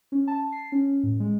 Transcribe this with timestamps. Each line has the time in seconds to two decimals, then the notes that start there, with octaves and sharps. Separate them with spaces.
0.12 C#4
0.28 A5
0.52 C7
0.72 C#4
1.03 A2
1.20 G#3